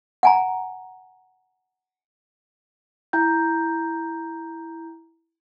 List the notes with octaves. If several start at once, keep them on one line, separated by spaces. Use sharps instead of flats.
F#5 G#5 A#5
E4 G5 A#5 G6